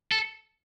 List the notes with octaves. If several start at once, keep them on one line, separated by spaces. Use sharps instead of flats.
A4